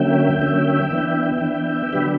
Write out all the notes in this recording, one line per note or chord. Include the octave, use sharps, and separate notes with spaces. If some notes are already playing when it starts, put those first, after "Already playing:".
Already playing: D3 F#3 A#3 C#4 E5 G5
D3 F#3 A#3 C#4
E3 B3 D4
E3 B3 D4
D3 F#3 B3 D4 G4 B4